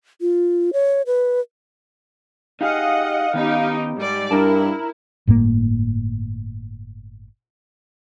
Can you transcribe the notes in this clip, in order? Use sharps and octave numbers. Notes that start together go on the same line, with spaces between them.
F4
C#5
B4
D#4 G4 G#4 D#5 F5 F#5
D#3 B3 C#4 D#4 G4
G#2 G3 D5
G2 D4 E4 A#4 A5
G1 A2 C3 A#3